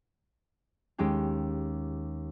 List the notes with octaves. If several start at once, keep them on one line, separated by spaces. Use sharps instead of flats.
D#2 G#3 C#4 G4 G5